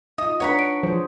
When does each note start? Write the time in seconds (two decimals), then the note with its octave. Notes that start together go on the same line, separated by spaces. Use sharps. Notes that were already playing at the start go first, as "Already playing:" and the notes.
0.18 D#4 F4 D#5 D#6
0.40 D4 B4 C#5 F#5 A#5 B5
0.59 D7
0.83 F3 G#4 C5